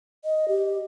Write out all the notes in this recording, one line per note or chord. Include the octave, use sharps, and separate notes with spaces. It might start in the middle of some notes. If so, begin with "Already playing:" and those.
D#5
G4